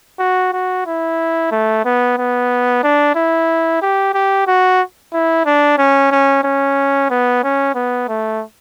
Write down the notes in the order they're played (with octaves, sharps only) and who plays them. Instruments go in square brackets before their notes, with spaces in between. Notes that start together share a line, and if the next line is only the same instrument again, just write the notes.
[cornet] F#4
F#4
E4
A3
B3
B3
D4
E4
G4
G4
F#4
E4
D4
C#4
C#4
C#4
B3
C#4
B3
A3